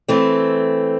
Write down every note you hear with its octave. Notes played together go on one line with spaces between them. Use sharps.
E3 A3 C4